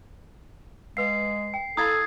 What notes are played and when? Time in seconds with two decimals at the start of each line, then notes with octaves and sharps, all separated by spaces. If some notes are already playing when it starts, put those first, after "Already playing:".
0.97 G#3 B4 F5 C7
1.54 G5
1.77 E4 A4 F5 B5 D#6 G#6 A6